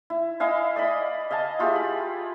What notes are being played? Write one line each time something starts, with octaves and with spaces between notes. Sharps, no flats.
E4
E4 D#5 F5 G#5
D5 D#5 G#5 B5
D#5 F5 G#5 A5
E4 F4 G4 G#4
B5